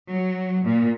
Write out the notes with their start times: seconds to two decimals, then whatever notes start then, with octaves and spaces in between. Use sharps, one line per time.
0.10 F#3
0.65 A#2